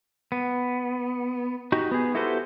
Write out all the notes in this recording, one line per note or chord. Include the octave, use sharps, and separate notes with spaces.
B3
D#4 F#4 G4
B3 G#4
E4 F#4 G4 A4 B4 C5